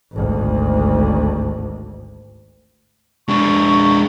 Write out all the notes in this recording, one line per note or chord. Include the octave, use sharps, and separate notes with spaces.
G#1 D2
G#3 D4 C#6